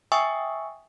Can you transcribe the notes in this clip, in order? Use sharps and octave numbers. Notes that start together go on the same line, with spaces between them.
E5 G5 G#5 C#6 D#6 E6